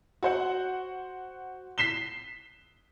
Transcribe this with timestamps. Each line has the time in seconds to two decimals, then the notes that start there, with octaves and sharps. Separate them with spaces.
0.23 F#4 C5 F#5
1.78 B6 C7 E7 G7